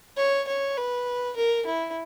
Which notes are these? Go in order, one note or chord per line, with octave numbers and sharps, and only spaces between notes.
C#5
C#5
B4
A#4
E4